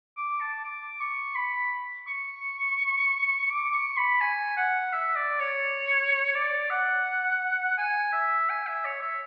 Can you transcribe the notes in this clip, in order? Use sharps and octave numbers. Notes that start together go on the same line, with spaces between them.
D6
A5
D6
C#6
B5
C#6
D6
C#6
B5
G#5
F#5
E5
D5
C#5
D5
F#5
G#5
E5
G#5
E5
C#5
E5